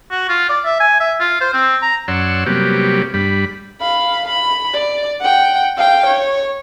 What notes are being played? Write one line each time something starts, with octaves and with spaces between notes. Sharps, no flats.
F#4
F4
D5
E5
G#5
E5
F4
C5
C4
A#5
F#2 C#5 D5 F#5 C6 E6
C3 F#3 G3 A#3 B3 G4
G2 G3 B5
F5 B5
B5
D5
F#5 G5
F5 G5
C#5